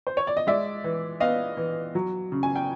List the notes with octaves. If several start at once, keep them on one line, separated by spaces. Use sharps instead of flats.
C5
C#5
D5
D#5
G#3 D5 E5
E3
B3 D#5 F5
E3
F#3
C#3
G#5
G5